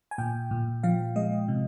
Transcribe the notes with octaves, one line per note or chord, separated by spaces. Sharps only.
G#5
A#2 G5
A#2
F3 F5
G#3 D#5
C3